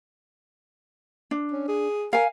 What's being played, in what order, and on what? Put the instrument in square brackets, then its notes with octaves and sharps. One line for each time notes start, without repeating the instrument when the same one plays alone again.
[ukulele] D4
[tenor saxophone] C#4
G#4
[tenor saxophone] A#4 [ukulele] F5 G#5